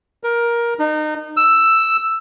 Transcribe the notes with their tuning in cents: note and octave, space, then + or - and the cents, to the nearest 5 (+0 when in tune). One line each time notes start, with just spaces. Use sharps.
A#4 +15
D#4 -30
E6 +5